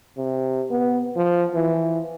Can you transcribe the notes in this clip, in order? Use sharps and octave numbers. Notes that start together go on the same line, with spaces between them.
C3
B3
F3
E3